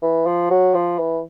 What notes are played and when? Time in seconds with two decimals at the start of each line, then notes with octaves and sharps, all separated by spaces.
0.02 E3
0.26 F3
0.50 F#3
0.74 F3
0.99 E3